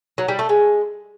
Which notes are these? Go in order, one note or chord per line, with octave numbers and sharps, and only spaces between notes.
F#3
G3
A3
G#3